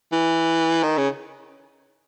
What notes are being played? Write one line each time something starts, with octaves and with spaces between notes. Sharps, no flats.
E3
D#3
C#3